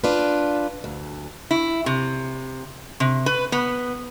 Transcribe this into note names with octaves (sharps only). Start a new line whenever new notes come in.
D4 F4 B4
D2
E4
C3
C3
B4
B3